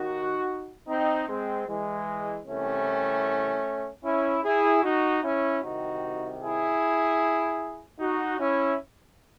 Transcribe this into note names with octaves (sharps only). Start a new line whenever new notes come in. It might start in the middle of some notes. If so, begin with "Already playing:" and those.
Already playing: D#2 D#3 D#4 F#4
C4 D#4
G#3 C4
E3 G#3
C2 C3 E3 A3 C#4
C#4 E4
E4 G#4
D#4 F#4
C#4 E4
C2 C3 D#3 D#4 F#4
E4 G#4
D#4 F#4
C#4 E4